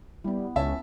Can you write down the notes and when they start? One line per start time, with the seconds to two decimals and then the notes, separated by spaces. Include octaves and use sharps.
0.24 G3 B3 E4
0.56 C#2 C#4 E5 A5